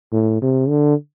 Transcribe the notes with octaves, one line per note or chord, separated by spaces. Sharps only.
A2
C3
D3